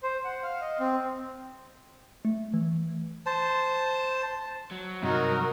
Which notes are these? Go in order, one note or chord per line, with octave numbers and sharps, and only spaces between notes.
C5
F#5
F5
D#5
C4
A3
E3
C5 A5
F#3
G2 C3 G3 D#4 F#4 A#4